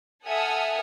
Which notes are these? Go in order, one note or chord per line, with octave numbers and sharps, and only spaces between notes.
A4 E5 F#5 G#5 D#6 F6